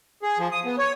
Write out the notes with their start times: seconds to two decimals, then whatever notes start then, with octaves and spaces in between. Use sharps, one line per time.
0.22 G#4
0.39 F3
0.52 D#6
0.65 B3
0.78 C#5